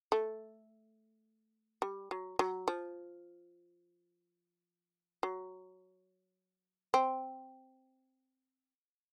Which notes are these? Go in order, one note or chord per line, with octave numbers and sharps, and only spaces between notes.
A3
G3
F#3
F#3
F3
F#3
C4